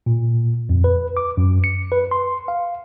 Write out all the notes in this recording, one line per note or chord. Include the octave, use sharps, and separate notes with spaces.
A#2
F2
B4
D6
F#2
C#7
B4
C6
F5